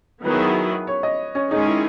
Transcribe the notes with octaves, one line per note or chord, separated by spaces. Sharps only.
D#3 F#3 B3 E4 G#4 B4
C#5
D#5
C#4
D#3 G#3 C#4 D#4 G#4
E4